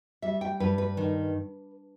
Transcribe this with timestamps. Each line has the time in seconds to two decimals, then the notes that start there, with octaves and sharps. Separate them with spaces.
0.22 G3 E5
0.41 G5
0.60 G2 B4
0.78 B4
0.97 D#3